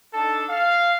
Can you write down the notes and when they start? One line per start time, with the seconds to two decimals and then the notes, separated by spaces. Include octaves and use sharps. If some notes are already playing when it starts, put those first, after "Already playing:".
0.14 D4 D#4 A4 A5
0.50 F5